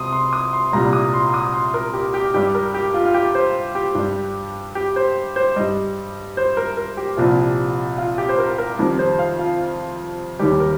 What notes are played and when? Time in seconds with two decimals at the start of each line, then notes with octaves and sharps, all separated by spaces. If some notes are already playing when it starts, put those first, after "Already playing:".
Already playing: C2 C3 C6 D#6
0.13 C6
0.33 D#6
0.53 C6
0.73 C2 A#2 G3 A#5
0.93 D#6
1.14 C6
1.34 D#6
1.54 C6
1.74 A#4
1.94 G4
2.14 G4
2.34 G2 G3 G4
2.54 A#4
2.74 G4
2.94 F4
3.06 F4
3.14 G4
3.35 C5
3.75 G4
3.95 G2 G3
4.75 G4
4.96 C5
5.36 C5
5.56 G2 G3 D#5
6.37 C5
6.57 A#4
6.77 A#4
6.97 G4
7.17 C2 A#2 F3
7.98 F4
8.18 G4
8.29 C5
8.38 A#4
8.58 A#4
8.79 F2 D#3 G3
8.99 C5
9.19 F5
9.39 F4
10.39 D#2 D#3 G3 G4
10.60 A#4